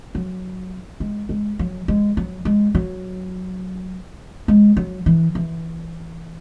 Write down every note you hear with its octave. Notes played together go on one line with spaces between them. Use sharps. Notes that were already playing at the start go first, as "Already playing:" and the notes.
F#3
G#3
G#3
F#3
G#3
F#3
G#3
F#3
G#3
F#3
E3
E3